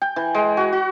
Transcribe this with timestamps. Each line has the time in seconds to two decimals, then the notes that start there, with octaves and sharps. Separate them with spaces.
0.02 G5
0.16 E3
0.35 G#3
0.57 F#4
0.73 F#4